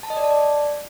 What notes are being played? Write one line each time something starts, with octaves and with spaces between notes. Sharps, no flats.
A5
D#5
D5
A5
D5